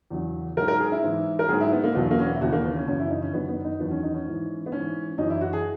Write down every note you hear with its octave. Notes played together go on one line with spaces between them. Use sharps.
E2 C#3 F#3
G#2 F#3 A#4
A#4
G#4
E4
G#2 E3
A#4
G#2 F#3 G#4
E4
B3
A#3
E2 B2 F#3 B3
A#3
C#4
B3
E4
D#2 C#3 E3 F#4
A#3
B3
C#4
F#2 C#3 E3 C#4
E4
D#4
C#4
F#2 D#3 F#3 B3
B3
D#4
E2 D#3 F#3 B3
C#4
D#4
C#4
G#2 E3
B3
G#2 E3 C#4
F#2 E3 D#4
E4
F#4
G#4